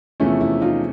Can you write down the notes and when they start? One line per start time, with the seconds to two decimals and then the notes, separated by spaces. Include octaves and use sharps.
0.20 E2 C3 F3 A3 C#4 E4
0.41 E4
0.61 D#4 F4